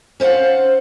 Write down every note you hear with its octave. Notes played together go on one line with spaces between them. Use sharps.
C#4 C5 D5 F5 F#5